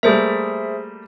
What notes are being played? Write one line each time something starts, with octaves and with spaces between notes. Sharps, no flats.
G3 A3 A#3 G#4 C5 E5